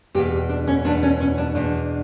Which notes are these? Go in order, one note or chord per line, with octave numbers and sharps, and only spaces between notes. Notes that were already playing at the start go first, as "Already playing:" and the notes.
E2 B2 G4
D4
C#4
E2 B2 D4
C#4
C#4
D4
E2 B2 D4